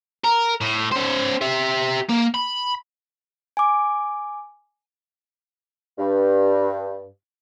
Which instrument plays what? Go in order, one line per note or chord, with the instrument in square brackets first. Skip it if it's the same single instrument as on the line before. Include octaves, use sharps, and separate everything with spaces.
[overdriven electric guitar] A#4
A2
C#4 C5
G4 E5
A#3
B5
[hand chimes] G#5 D6
[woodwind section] G2